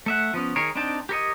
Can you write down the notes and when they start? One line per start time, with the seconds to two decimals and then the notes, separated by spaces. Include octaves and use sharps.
0.06 A3 E5 F#5
0.34 F3 B3 C#4
0.56 D#3 G#4 A#4 C#5
0.75 C4 D4 D#4 G5 A5
1.09 G4 A#4 C#5 D#5